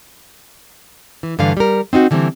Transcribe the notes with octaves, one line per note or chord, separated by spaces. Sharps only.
E3
G2 D3 E3 F5
G3 A#4
C4 D#4 F4 F#4
D3 E3 G3 A#3 C4